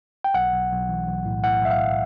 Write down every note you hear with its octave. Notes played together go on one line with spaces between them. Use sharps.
G5
B1 F#5
B1
B1
E3
B1
A2
A2 F#5
B1 E5
F5
B1